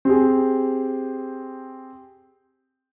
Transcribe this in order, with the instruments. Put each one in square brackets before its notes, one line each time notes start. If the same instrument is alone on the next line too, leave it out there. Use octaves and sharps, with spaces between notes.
[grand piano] C4 G4 G#4